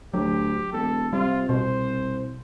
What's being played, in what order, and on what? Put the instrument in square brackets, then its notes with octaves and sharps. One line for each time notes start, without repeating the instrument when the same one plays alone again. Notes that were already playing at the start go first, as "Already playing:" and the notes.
[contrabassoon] D2 [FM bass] F#3 [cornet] G4
[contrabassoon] E1 [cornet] A4
[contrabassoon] C3 [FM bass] G3 [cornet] F4
[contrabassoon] C2 [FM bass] B2 [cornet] C5